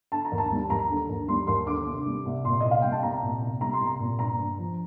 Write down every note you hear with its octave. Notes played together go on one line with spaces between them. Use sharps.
D3 A5
A#5
D#2
A5
G3
D#2 A#5
D3
D#2
G3 C6
D#2 C6
D3 D6
C2
G3
C2
A#2 C6
C2 D#5
F5
G3 G5
A5
C2 A#5
A#2
C2
G3 A#5
C6
C2
A#5
A#2
G2 A#5
G2
F3